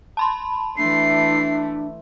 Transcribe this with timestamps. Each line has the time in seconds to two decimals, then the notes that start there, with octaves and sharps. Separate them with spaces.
0.17 A5 B5 C6
0.77 E3 A3 D4 C7